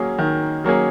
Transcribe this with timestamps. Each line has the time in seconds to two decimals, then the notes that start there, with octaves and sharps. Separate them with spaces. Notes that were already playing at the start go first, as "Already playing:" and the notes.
Already playing: F#3 A#3 C#4 G#4
0.19 D#3
0.64 F#3 A#3 C#4 G#4